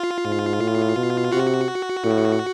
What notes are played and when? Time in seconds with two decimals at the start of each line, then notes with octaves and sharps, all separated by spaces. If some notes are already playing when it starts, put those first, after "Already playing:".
Already playing: F4
0.25 G#2
0.61 A2
0.97 B2
1.33 C3 F#4
2.05 A2